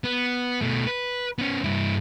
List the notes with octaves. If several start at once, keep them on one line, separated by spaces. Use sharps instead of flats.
B3
B2 A3
B4
B3 C#4
G2 E4